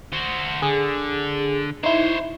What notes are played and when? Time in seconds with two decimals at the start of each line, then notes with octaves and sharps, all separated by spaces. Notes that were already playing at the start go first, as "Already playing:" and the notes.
0.13 F#4 C5
0.62 D3 G#4
1.83 D#4 E4 C5 C#5